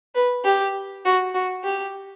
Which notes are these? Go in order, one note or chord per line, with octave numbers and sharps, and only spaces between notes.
B4
G4
F#4
F#4
G4